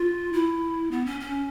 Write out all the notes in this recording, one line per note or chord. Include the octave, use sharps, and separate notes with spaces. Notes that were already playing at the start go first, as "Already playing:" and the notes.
Already playing: F4
E4
B3
C#4
C#4